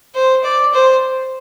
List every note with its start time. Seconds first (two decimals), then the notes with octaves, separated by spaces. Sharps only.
0.15 C5
0.44 D5
0.74 C5